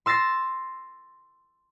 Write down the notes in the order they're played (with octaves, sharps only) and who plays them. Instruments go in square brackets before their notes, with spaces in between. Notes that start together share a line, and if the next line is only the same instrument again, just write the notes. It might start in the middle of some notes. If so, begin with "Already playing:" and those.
[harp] C6 E6 A6 A#6 C7